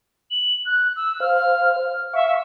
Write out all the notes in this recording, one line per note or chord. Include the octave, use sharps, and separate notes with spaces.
F#7
F#6
E6
C5 F5 F6
F6
E5 F5 C#6